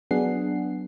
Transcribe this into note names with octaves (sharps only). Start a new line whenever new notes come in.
F#3 B3 D4 G#4 F#5 C7